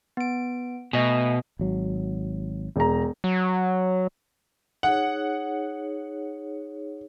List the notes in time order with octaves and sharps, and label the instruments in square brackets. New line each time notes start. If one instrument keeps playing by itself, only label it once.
[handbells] B3 D7
[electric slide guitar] B2 [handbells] A3 D#5 G#5
[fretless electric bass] G#1 F#3
[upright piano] E1 A#5
[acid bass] F#3
[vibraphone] D#4 G#4 C#5 [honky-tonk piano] F#5